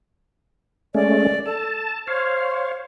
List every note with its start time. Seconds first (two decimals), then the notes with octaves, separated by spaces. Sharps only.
0.94 G#3 A3 C#4 D5
1.46 A4 A5
2.07 C5 C#5 F5